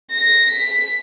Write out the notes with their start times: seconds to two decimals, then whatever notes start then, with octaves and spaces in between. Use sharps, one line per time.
0.11 A#6
0.50 B6